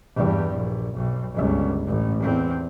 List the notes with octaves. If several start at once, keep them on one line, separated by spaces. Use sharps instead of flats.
E2 G2
A#1
B1
G1 C#2
A1
E2 C4